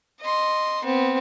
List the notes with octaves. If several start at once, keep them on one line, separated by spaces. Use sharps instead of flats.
D#5 C6
B3 C4